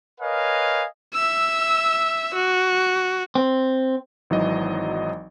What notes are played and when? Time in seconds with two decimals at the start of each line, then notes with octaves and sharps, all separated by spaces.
0.21 A#4 B4 C#5 D#5 F5 G#5
1.14 E5 E6
2.34 F#4
3.35 C4
4.30 G#1 E3 F#3 D#4 D#5